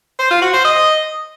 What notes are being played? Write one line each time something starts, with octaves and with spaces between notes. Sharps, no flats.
C5
F4
F#4
C5
D#5